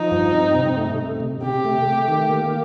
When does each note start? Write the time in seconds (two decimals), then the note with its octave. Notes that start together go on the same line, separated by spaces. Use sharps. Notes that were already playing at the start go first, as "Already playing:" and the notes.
Already playing: F3 D#4
0.11 G2
0.33 C4
0.55 C3
0.76 A3
0.98 C3
1.20 C3
1.42 C3 G4
1.65 A3
1.86 A3
2.08 D#3
2.30 A#3